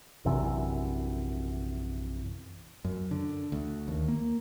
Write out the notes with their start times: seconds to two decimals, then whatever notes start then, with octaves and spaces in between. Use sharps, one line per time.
0.25 A#1 F#2 C3 E3
2.84 F#2
3.11 D3
3.52 D2
3.88 D#2
4.08 A#3